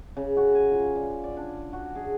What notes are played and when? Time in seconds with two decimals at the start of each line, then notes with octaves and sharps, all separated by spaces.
0.17 C#3
0.37 F#4
0.55 G#5
0.72 F4
0.95 D5
1.24 D5
1.37 D4
1.73 F#4
1.95 G#4